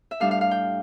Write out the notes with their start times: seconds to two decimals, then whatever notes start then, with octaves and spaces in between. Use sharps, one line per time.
0.11 E5
0.20 A2 G3 D4 F5
0.31 F5
0.41 F5
0.51 G5